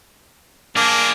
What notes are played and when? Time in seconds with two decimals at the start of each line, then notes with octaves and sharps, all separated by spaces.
0.76 A#3 D4 G#4